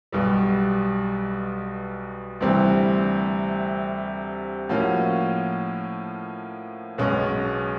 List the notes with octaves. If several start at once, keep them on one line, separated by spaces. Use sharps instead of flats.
B1 B2 G3
D2 C3 E3 G3 C4
A2 F3 A#3 C#4 F#4
B1 B2 G#3 C#4